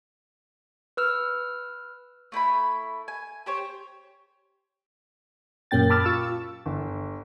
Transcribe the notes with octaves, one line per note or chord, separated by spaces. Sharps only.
B4 E6 F6
A3 E4 G5 B5
G#5
G4 C5 C#5
F#2 A#2 A#3 C#4 G5 A6
A5 B5 D6 E6 F6 A6
F4 C#6 E6
G1